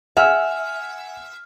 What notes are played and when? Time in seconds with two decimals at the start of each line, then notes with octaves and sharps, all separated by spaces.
0.17 E5 F#5 G#5 F6